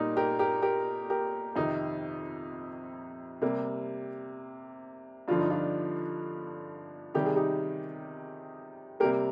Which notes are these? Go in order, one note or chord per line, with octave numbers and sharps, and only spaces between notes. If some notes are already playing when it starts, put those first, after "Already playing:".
Already playing: A#2 G3 A#3 D#4
G4 A#4
G4 A#4
G4 A#4
G4 A#4
F2 C3 D#3 D#4
C3 G3 A#3
G2 D3 F3 F4
D#4
D4 F4
C3 D#3 G3 G4
G#4
D#4 G4
C3 G3 A#3 G4 A#4